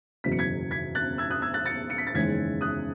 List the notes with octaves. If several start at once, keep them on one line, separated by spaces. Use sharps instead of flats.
F#1 E2 B2 F#3 B6
C#7
G#6 B6
G#6 B6
F#6 A6
E6 G#6
D#6 F#6
E6 G#6
F#6 A6
A6 C#7
C#7
B6
A6
F#1 E2 D#3 G#3 C#4 G#6 B6
D#6 F#6